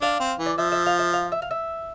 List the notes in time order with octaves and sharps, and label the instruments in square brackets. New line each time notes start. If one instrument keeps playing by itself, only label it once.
[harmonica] D4 [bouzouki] F5
[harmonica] C4
E3
[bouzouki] D5
[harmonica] F3 [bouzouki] E5
[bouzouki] E5
F5
E5
F5
E5
F5
E5